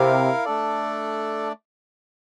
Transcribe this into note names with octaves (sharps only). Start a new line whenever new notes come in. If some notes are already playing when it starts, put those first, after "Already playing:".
Already playing: C3 E4 A#4 F5
A3 D4 A4 D5